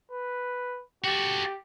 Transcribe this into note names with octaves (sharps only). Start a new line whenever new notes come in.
B4
F#4 G4 A4